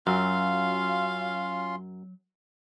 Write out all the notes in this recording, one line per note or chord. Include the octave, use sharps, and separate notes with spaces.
F#2 F#3 C#4 F4 F5 C6